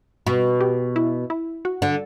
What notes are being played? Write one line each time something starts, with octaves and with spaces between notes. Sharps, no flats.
B2
G4
E4
E4
F#4
D3